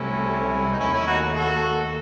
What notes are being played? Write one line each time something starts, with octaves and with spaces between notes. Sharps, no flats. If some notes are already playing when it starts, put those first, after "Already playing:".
Already playing: C2 C3 F#3 A3 C#4 E4
D#4
D#2 D#3 A3 C#4 E4
C#4 E4
D#4 F#4
F#4 A4